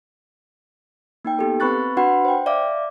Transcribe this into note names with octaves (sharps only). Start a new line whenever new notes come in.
A#3 D#4 G5
B3 G4 A4
C4 B4 B5 C#6 F#6 A6
D4 F#4 B4 F#5 B5 C6
C5 G5
D5 E5 F5 D6